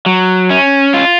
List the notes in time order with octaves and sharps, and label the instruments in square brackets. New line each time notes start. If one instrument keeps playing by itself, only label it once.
[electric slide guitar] F#3
C#4
F4